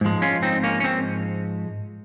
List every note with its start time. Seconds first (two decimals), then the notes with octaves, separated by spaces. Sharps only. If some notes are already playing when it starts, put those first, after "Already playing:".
0.01 G#2 F3 G#3
0.22 C#4 F4
0.43 C4 D#4
0.63 A#3 C#4
0.80 C#4
0.84 C4